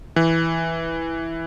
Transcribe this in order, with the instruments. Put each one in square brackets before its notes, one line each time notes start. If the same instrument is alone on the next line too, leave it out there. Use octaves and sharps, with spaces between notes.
[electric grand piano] E3